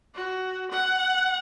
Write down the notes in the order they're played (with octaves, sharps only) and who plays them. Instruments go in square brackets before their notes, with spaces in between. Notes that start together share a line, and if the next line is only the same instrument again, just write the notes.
[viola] F#4
F#5